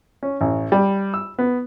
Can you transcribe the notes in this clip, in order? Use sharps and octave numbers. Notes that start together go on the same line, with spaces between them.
C#4
A1
G3
E6
B3